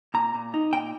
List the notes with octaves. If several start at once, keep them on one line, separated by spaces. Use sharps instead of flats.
A#2 A#5
A#2
D#4
A#2 G5